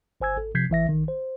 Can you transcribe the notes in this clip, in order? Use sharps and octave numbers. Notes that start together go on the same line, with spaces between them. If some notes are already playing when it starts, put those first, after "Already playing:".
G1 C5 G#5 E6 G#6
G#1 A4
C3 F3 G6 G#6 B6 C7
A1 E3 E5 A#6
A#1 D#3
C5